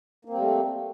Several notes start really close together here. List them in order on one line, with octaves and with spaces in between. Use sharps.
A#3 C4 G3 A3